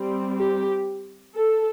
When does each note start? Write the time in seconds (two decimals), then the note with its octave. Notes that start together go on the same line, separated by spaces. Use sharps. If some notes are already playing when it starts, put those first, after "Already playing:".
Already playing: G3 C4
0.38 G4
1.36 A4